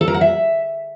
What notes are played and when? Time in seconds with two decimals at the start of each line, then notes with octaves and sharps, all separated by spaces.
0.01 A4
0.08 A#4
0.14 F#5
0.21 E5